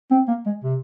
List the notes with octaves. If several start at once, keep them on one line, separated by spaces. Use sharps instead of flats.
C4
A#3
G#3
C3